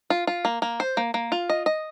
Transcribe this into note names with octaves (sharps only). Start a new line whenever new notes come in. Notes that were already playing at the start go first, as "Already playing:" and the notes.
F4
F4
A#3
A#3
C5
A#3
A#3
F4
D#5
D#5